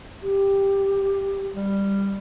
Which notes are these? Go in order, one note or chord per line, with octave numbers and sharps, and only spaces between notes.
G4
G3